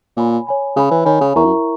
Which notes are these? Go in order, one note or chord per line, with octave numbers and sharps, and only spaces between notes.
A#2 C#5 G#5 B5
C#5 G#5 B5
C#3 C#5 G#5 B5
E3
D#3 C#5 G#5 B5
C#3
E2 E4 A#4 E5 A#5 C#6
F#2